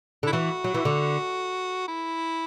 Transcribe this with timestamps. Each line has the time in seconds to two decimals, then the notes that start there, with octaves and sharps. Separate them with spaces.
0.23 D3 E4
0.33 E3 F#4
0.64 F#3
0.74 E3
0.85 D3
1.88 E4